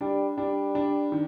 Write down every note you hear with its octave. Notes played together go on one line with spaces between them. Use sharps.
G3 D4
G3 D4
D4
D#3